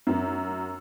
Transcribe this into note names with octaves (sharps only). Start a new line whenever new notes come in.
F#2